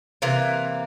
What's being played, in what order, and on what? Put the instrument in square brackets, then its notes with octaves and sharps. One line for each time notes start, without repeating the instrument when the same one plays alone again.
[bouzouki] C3 E3 A#3